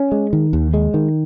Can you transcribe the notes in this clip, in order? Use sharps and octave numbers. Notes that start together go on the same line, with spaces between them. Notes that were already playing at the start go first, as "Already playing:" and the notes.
Already playing: C#4
G#3
D#3
D#2
G#3
D#3